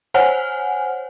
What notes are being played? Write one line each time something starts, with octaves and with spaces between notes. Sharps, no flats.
C5 C#5 F#5 G#5 F6